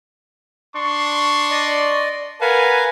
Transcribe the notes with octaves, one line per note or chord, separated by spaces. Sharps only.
D4 C6 C#6
D5 D#5
A#4 B4 F5 F#5 G#5